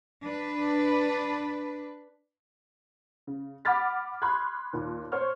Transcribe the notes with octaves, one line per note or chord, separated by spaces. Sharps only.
D4 B4
C#3
F#5 B5 D6 F6 A6 B6
B5 C6 F6 F#6 G#6
D#2 A#2
C5 C#5 C#6 F6